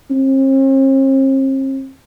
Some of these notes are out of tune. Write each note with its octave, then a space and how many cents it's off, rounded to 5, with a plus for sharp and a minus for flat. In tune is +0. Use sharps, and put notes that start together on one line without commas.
C4 +45